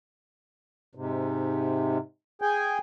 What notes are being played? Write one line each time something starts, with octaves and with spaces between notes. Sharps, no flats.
G#2 C3
G#4 G5 G#5